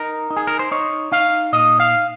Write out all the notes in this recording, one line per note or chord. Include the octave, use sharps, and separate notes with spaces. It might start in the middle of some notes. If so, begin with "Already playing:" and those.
Already playing: D#4 A#4
D#4
G#4
A#4
C5
D#4 C#5
D#4 F5
A#2 D#5
F5